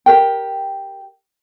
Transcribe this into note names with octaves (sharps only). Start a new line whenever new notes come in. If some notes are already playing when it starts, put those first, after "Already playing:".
G4 A#4 G5